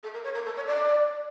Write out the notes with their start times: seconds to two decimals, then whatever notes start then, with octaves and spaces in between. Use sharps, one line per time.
0.03 A4
0.13 A#4
0.24 C#5
0.34 A#4
0.45 A4
0.56 C#5
0.66 D5